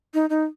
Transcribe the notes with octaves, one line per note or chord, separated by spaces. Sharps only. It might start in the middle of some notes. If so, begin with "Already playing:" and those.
D#4
D#4